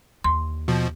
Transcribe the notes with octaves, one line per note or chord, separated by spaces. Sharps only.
D#2 D3 C6
B2 F3